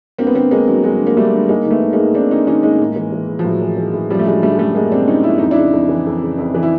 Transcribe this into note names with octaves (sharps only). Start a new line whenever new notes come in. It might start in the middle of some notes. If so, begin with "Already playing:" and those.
G2 A#3 C4
B3
D3 A#3 C4
D3 G#3 A#3
G2 F#3
G2 F#3 G#3
D3
A#3
D3 G3 A3
G2
G#2 G#3 A#3
D#3
A3 B3
D#3
G#3 A#3
G#2
G#2 C4 D4
D#3 C#4 D#4
D#3 C#4 D#4
G#2 G#3 A#3
A2
E3
E3
A2
F3
A2 F#3
E3
E3
A2
F#2 F3 G3
A3
D3 F#3 G#3
D3 G3 A3
G#3
F#2 G3 A3
F#2 G#3 A#3
D3 C4 D4
D3 C#4 D#4
F#2 E4
F2 D#4
D4 E4
C#3
F2
E3
F2
C#3
F2
E3
E4